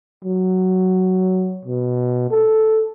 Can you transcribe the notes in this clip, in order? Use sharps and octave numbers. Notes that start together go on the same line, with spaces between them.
F#3
B2
A4